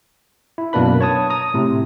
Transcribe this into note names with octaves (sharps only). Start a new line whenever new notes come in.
E4
F#2 B2 A#3 D4 B4 B5
C#5 A5 D#6
A#5 D#6
A2 C3